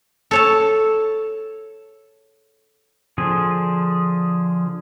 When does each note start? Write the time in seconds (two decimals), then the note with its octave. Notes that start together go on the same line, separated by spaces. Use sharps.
0.31 A4 C#5 A5
3.18 D3 F3 G#4